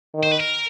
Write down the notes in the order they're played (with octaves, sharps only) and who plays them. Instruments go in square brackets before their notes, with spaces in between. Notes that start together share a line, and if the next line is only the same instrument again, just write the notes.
[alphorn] D#3
[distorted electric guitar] C5
B4
A#4